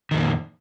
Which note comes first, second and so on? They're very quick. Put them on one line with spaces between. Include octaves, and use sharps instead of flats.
D#3 F2 A#2